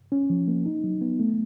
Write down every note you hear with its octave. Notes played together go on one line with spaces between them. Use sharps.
C#4
F3
A#3
D#4
F#3
B3
A3